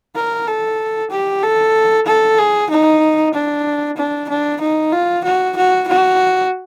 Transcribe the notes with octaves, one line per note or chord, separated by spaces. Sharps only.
A#4
A4
G4
A4
A4
G#4
D#4
D4
D4
D4
D#4
F4
F#4
F#4
F#4